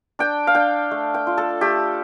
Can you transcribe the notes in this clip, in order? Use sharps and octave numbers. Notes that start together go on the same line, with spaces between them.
D4 G5
F5
D4 G5
A3
G5
F4
A4
A3 G4